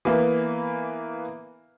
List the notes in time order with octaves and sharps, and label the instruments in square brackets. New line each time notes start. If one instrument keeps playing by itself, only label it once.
[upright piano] E3 A#3 B3